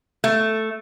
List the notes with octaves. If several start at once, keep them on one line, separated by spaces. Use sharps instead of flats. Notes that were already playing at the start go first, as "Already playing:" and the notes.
A3